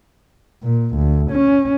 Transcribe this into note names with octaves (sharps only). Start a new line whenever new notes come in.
A#2
D2
C#4